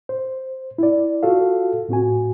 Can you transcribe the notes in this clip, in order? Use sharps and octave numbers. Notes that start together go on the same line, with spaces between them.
C5
E4 D5
F4 F#4 A4 F5
A2 C4 F#4 G#5